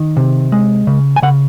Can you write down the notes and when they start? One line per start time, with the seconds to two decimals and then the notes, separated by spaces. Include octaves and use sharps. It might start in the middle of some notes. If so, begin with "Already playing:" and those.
Already playing: D#3
0.17 C3
0.52 G#3
0.87 C#3
1.16 G#5
1.22 C#3 F#5